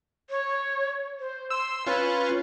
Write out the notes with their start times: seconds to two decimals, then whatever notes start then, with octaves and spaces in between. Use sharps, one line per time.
0.30 C#5
1.19 C5
1.50 C6 E6
1.86 C#4 F4 B4